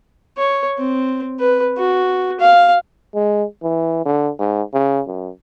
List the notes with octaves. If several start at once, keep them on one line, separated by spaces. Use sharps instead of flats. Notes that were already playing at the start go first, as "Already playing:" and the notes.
C#5
C4
B4
F#4
F5
G#3
E3
D3
G#2
C#3
F#2